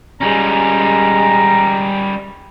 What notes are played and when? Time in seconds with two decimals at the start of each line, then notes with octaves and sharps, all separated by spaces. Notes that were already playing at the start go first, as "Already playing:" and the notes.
0.21 G3 G#3 C#4 A#5